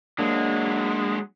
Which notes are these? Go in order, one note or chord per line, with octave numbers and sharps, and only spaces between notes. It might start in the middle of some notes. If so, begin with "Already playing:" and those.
F#3 G#3 A#3 D4